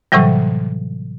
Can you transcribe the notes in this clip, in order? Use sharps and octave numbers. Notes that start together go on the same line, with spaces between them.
A2 C3 E3 F#3 G3